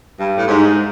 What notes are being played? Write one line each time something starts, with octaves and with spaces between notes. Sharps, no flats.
G2
A2
G#2